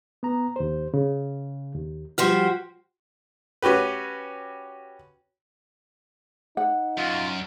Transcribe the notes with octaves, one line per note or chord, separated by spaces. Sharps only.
B3 A#5
D#2 C5
C#3
D#2
F3 G3 F#4 G4 C6 F6
C#4 F#4 G4 B4
D#4 F#5
F#2 F4